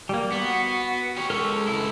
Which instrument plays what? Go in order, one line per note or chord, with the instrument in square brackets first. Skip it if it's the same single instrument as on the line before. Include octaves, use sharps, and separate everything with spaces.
[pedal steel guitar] G3 A#3
[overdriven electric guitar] B3 [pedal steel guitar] F#4
[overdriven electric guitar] G4 C#5
[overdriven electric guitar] G#3 C#5 [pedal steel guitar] A4 A#4 F6
[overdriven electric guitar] C#2 E4